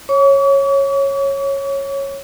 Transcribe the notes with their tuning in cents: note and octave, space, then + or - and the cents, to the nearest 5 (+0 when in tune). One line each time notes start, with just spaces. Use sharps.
C#5 -10 C#6 +45